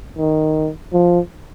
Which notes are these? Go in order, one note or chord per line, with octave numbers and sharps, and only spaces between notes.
D#3
F3